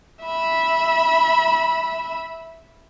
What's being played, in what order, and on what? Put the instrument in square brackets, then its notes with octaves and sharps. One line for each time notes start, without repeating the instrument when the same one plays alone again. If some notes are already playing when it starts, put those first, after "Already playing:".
[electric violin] E5 B5